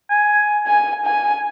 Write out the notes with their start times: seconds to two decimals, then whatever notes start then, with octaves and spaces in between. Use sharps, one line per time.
0.10 G#5
0.67 G#5
1.05 G#5